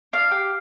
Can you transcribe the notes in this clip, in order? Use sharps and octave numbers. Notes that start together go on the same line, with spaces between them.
D4 F5
G4